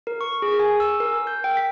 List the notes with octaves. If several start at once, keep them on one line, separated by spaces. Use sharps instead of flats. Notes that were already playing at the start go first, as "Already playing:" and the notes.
A#4
C#6
G#4
G#5
E6
A#4
G6
G5
B6